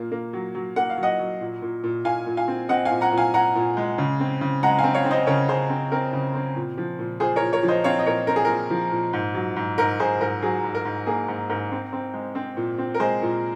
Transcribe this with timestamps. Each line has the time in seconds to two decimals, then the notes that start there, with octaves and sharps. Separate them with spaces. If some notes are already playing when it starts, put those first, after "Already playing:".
Already playing: A#2 A#3
0.12 A#3
0.33 F#3
0.55 F#3
0.76 A#3 F#5
0.90 F5
0.97 F#3
1.03 D#5 F#5
1.19 F#3
1.41 A#2
1.62 A#2
1.84 A#2
2.05 A#2 F5 G#5
2.26 A#2
2.37 F5 G#5
2.48 C4
2.69 C4 D#5 F#5
2.85 F5 G#5
2.91 A#2
3.01 F#5 A#5
3.12 A#2
3.18 F5 G#5
3.34 A#2 F#5 A#5
3.55 A#2
3.77 G#3
3.98 C#3
4.20 C4
4.41 C#3
4.63 G#3 F#5 A#5
4.79 F5 G#5
4.84 C4
4.94 C#5 F5
5.05 C4
5.11 C5 D#5
5.27 C#3 A#4 C#5
5.48 C#3 G#4 C5
5.69 C4
5.92 C4 A#4
6.13 C#3
6.34 C4
6.56 A#2
6.78 F3
6.99 A#2
7.20 A#2 G#4 C5
7.36 A#4 C#5
7.42 A#2
7.53 A#4 C#5
7.63 F3
7.68 C5 D#5
7.84 C4 C#5 F5
7.99 D#5
8.06 A#2 A#4 C#5
8.27 C4 A#4
8.36 G#4
8.45 A#2 A#4
8.70 F3
8.92 A#2
9.13 G#2
9.34 F#3
9.56 G#2
9.78 G#2 A#4
10.00 G#2 G#4 C5
10.21 G#2 A#4
10.42 F#3 G#4
10.64 G#2
10.75 A#4
10.85 G#2
11.07 A#3 G#4
11.28 G#2
11.50 G#2 A#4
11.72 C4
11.93 C4
12.14 G#3
12.35 C4
12.57 A#2
12.78 C4
12.94 A#4
13.00 G#3 G#4 C5
13.22 A#2